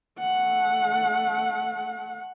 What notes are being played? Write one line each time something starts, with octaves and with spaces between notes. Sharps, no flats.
A3 F#5